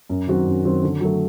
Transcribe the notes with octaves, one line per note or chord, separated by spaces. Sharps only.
F#2
D#3 F#3 C4 F#4
F#2
D#3 F#3 C4 F#4
D3
F#3 A3